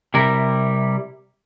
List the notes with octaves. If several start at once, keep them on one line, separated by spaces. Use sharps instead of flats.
C3 G3 E4 A#4